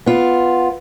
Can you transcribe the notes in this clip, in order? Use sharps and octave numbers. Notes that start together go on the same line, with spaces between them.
B3 F4